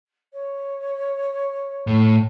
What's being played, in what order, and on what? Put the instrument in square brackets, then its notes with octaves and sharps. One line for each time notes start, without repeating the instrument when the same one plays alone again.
[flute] C#5
[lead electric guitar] A2